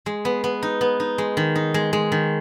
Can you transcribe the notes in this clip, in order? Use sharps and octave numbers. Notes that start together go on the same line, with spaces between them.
G#3
B3
B3
D#4
B3
D#4
G#3
D#3
D#4
G#3
G#3
D#3